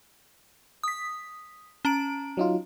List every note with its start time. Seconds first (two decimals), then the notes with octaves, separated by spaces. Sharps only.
0.84 D#6 B6
1.85 C#4 A#5 D7
2.37 F#3 D#4 F4